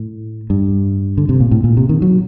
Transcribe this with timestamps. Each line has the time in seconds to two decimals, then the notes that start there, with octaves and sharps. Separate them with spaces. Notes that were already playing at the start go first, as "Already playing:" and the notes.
Already playing: A2
0.50 G2
1.18 D3
1.29 C3
1.40 A#2
1.51 A2
1.64 A#2
1.77 C3
1.89 D#3
2.02 F#3